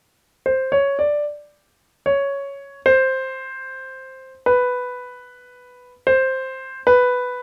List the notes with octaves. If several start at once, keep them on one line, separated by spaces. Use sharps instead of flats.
C5
C#5
D5
C#5
C5
B4
C5
B4